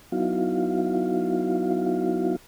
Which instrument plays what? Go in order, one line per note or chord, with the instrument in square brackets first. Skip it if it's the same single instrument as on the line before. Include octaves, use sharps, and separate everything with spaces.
[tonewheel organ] F#3 B3 D#4 E4 F#4 F5